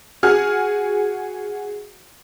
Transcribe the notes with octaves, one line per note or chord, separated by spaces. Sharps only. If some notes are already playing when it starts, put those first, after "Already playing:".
F#4 G#4 F6